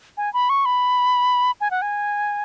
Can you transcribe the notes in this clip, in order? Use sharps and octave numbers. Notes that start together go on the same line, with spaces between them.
G#5
B5
C#6
B5
G#5
F#5
G#5